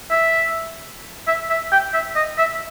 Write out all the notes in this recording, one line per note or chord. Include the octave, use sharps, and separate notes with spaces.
E5
E5
E5
G5
E5
D#5
E5